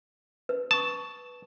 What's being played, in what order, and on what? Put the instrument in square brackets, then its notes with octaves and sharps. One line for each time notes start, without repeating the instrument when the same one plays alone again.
[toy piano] B4
[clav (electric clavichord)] A5 [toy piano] C#6 D#6